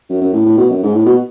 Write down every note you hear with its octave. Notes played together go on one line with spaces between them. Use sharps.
F#2
F#2
A2
A2
B2
F#2
G#2
A2
B2